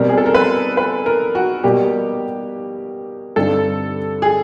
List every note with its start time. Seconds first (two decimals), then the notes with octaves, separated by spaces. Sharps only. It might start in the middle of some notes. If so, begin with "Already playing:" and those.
Already playing: B2 G3 C4 A#4
0.09 G#4
0.18 A4
0.26 A#4
0.34 B4
0.77 B4
1.06 A#4
1.35 F#4
1.63 B2 G3 A#3 G4
3.36 G2 D3 G3 C4 D#4 A4
4.22 G#4